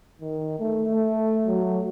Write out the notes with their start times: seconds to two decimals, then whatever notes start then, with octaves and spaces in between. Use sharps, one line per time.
0.21 D#3
0.59 A3
0.90 A3
1.47 F#3